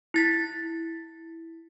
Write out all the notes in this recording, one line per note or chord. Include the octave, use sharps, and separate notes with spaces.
E4 A6 B6